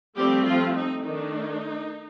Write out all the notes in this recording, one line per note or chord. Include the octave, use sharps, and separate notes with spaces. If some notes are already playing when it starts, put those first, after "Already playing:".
F3 G3 A3 C4 G4
F3 F4
D#4
D#3 A3 D4 D#4